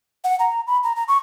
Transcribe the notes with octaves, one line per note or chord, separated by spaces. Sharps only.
F#5
A#5
B5
A#5
A#5
C#6